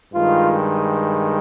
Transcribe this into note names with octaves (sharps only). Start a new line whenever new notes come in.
G2 D#3 G#3 F4